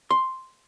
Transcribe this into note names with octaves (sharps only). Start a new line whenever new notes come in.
C6